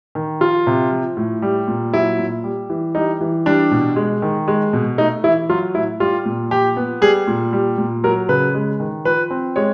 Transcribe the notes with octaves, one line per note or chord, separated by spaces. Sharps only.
D#3
F3 F4
C3
F3
A2
G3
A#2
F#3 E4
A#2
G3
E3
G3 D#4
E3
G3 D4
B2
G#3
D#3
G#3
B2
A3 D#4
E3 E4
F#3 F4
A2 E4
G3 F4
A#2
F3 G4
B3
G3 G#4
A#2
G3
A#2
F#3 A#4
C#3 B4
G#3
D#3
F3 B4
C4
G#3 C#5